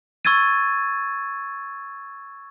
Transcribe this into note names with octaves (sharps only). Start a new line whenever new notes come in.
C#6 E6 G#6 A6 D#7